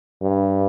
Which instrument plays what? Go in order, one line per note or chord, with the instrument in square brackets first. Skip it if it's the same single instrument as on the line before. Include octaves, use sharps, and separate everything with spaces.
[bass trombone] G2